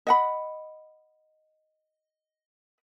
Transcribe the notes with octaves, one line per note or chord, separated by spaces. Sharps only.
D#5 F#5 B5